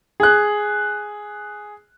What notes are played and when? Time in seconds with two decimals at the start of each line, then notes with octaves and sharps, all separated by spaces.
0.20 G#4 F#6